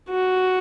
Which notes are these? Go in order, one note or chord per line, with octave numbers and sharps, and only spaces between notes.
F#4